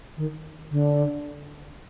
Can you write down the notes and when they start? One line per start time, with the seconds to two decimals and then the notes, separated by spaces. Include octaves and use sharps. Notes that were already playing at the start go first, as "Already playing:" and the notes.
0.17 D#3
0.71 D3